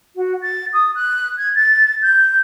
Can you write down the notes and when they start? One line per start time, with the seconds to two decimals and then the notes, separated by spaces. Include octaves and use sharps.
0.16 F#4
0.41 A6
0.73 D#6
0.94 F#6
1.37 G#6
1.55 A6
2.02 G6